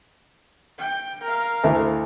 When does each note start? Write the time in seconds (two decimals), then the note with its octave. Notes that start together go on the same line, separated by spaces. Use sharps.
0.79 G5
1.24 A#4 F5
1.64 D2 A3 E4